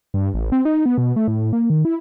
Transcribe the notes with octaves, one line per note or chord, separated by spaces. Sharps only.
G2
A1
C4
D#4
B3
B2
A3
A2
A#3
D#3
E4